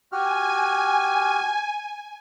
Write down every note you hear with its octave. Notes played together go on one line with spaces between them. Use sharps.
F#4 G4 G#5 F6